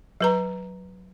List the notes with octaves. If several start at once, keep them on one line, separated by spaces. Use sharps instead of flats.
F#3 B4 A#5